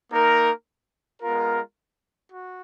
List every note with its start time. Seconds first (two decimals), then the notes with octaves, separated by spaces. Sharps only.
0.12 A#3 D#4 A#4
1.21 G#3 B3 F4 A#4
2.32 F#4